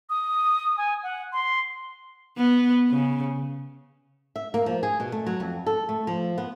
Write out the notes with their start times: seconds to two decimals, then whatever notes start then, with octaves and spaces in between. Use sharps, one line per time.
0.10 D#6
0.78 G#5
1.03 F#5
1.33 C6
2.38 B3
2.90 C#3
4.36 E5
4.54 A#3
4.66 F3
4.83 G#4
5.00 B2
5.12 A3
5.26 F#3
5.40 F2
5.66 A4
5.89 A3
6.07 F3
6.38 B3